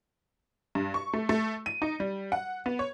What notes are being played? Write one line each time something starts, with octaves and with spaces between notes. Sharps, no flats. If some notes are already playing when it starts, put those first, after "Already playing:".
G2
C#6
A3
A3
D#7
D#4
G3
F#5
B3
C#5